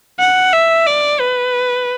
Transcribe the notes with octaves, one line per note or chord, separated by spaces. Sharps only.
F#5
E5
D5
B4